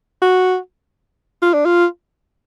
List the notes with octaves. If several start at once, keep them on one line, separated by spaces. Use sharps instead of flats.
F#4
F4
D4
F4